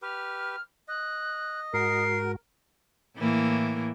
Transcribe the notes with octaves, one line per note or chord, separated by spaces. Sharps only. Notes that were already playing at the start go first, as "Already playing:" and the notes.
G4 B4 F6
D#5 F#6
G#2 F#4 A#4 C7
A2 E3 A#3